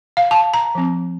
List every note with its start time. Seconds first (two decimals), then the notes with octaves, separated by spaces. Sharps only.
0.17 F5
0.31 A5
0.54 A#5
0.75 F3 C4